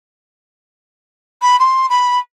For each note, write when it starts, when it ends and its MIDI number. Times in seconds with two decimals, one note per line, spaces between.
1.42 1.59 83
1.59 1.89 84
1.89 2.19 83